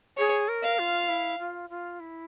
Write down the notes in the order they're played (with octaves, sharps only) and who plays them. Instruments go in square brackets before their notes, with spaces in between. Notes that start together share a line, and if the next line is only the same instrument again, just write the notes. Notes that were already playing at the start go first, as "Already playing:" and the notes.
[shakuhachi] G#4 [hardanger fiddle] C#5
[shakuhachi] A#4
[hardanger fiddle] F5
[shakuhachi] F4
E4
F4
F4
E4